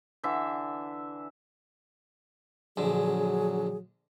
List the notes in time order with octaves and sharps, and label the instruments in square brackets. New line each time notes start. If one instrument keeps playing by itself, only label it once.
[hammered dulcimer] D3 E3 E5
[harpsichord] A#1 D3 [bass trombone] F#3 [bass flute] G#4